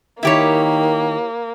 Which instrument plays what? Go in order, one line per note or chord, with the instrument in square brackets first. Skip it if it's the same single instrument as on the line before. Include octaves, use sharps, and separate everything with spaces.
[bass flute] D#3 [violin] A#3 [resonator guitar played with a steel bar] E4 G4 C#5